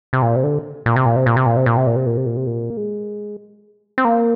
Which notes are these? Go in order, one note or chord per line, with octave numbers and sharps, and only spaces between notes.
C3
A#2
C3
D3
A#2
C3
A#2
C3
A#2
C3
A#2
C3
A#2
C3
A#2
C3
A#2
C3
A#2
C3
A#2
A#3
G#3
C4
A#3